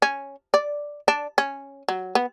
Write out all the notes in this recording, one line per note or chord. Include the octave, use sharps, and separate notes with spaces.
C#4
D5
D4
C#4
F#3
B3